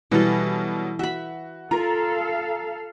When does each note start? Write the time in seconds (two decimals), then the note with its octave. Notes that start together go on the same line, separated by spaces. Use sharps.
0.11 B2 E3 F#3 G3 A4
0.99 F#4 E5 B5
1.71 F4 A4 A#4 F5 A#5